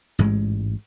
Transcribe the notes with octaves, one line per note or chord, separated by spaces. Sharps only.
A1 G#2 G#3